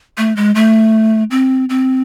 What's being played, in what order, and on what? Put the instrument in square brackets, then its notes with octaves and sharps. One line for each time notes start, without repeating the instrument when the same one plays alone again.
[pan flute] A3
G#3
A3
C4
C4